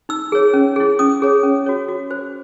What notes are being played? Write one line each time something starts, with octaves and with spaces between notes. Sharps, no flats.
D#4 E6
G#4 C#5
C#4
E4 G#4
C#4 D#6
G#4 C#5
C#4
F#4 C#5
F#4
C5